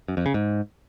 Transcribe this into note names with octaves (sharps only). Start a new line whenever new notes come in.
F#2
F2
C#3
G#2